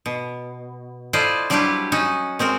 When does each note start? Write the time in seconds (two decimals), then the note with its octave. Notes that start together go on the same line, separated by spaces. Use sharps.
0.06 B2
1.13 E4 F4 A4 C5 D5 D#5
1.50 F#3 G3 D4 E4 F4 G4
1.92 C#4 D#4 F#4
2.39 G#3 C4 F#4 A#4